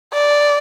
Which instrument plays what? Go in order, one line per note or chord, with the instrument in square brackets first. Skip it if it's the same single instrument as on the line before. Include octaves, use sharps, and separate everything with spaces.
[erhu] D5